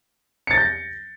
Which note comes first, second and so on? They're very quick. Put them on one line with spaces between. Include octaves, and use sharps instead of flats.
C#7 A6 A#6 G6